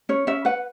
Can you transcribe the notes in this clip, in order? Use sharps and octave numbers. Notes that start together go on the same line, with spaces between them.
C#4 C#5
C#4 E5
B4 F#5